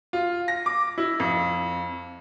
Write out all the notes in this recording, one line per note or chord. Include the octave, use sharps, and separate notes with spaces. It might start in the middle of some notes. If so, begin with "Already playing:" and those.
F4
A#6
D6
E4
F2